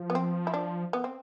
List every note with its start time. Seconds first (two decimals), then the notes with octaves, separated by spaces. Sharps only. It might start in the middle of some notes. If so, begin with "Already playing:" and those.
Already playing: F3
0.10 B3
0.15 C4
0.47 E4
0.54 D4
0.93 B3
1.04 C4